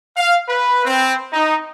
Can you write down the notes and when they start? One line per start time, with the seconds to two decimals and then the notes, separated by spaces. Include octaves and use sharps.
0.17 F5
0.49 B4
0.85 C4
1.33 D#4